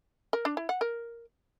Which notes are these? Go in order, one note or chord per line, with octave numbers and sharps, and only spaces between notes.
A#4
D4
E4
F#5
A#4